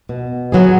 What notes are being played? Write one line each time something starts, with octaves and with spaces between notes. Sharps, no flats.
B2
F#3 B3 G#4